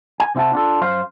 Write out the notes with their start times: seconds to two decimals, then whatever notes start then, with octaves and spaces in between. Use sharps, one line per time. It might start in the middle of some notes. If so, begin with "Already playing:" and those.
0.20 G#5
0.35 C3 C4 E4 F#5 A5
0.53 D4 F4 A4
0.82 F#2 C5 F5